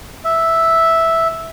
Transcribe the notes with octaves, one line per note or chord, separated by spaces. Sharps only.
E5